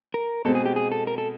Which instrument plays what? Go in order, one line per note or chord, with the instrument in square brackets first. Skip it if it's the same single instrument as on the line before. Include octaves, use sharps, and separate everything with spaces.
[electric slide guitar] A#4
[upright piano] B2 G#3 C4 [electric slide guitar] A4
[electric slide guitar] G#4
G4
G#4
A4
A#4
A4